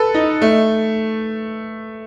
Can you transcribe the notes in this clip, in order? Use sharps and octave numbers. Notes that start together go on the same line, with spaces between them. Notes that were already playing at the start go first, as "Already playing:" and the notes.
Already playing: A4 B4
D#4
A3